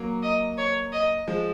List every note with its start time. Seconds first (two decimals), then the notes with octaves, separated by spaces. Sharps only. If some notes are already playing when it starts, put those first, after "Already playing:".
Already playing: F#3 A#3
0.23 D#5
0.58 C#5
0.93 D#5
1.27 F3 G#3